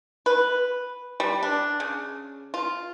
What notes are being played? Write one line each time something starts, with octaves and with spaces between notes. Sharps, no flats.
B4
G3
D4
C#3
F4